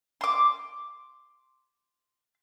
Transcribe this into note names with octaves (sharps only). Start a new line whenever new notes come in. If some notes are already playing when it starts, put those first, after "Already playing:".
C6 D6